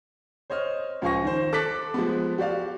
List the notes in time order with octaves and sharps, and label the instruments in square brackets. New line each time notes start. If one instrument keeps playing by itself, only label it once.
[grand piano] C5 C#5 D#5 F6
C#2 F3 F5 G#5 C#6 A#6
D#3 C5
A4 D6 F#6 A6 B6 F#7
F3 G#3 A3 B3
F#4 G4 D5 F5